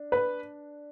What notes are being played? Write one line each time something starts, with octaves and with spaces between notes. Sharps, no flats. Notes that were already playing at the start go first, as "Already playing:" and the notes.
Already playing: D4
B4